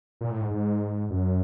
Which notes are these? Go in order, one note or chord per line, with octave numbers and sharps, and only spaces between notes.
A#2
A2
G#2
G#2
F#2